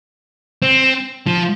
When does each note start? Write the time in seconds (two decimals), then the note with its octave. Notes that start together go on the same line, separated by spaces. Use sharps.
0.62 C4
1.27 F3